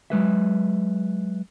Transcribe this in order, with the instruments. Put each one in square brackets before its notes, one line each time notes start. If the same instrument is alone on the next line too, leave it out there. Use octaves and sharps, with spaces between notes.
[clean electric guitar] F#3 G#3 B4 E5